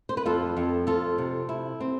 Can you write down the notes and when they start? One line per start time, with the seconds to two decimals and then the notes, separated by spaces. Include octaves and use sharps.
0.09 C5
0.17 B4
0.26 F2 F4 A4
0.57 F2
0.87 F2 F4 A4
1.18 C3
1.49 E4
1.80 C4